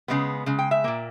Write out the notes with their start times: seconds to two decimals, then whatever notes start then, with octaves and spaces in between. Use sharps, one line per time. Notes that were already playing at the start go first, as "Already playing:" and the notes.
0.08 C#3 G#3 B3
0.46 C#3 G#3
0.59 G5
0.71 E5
0.84 A#2 A#3